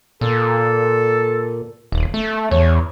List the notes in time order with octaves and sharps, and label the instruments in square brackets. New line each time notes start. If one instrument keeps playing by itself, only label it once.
[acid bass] A#2 [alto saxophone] A4
[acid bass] D#1
A3
[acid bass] E2 [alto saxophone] C#5